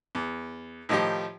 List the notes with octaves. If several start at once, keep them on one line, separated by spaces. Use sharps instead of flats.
E2
A2 D#3 F3 D#4 G4